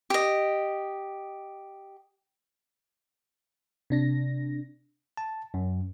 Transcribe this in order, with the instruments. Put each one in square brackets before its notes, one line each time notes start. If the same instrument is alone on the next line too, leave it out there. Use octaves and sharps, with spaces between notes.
[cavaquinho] G4 D#5
[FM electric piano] C3 D4 A#6
[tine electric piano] A5
F#2